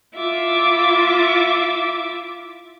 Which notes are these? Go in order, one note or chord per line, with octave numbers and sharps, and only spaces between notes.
E4 F4 E5 D6